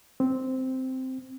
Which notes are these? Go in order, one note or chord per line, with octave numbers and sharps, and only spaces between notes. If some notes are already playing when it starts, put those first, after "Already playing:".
C4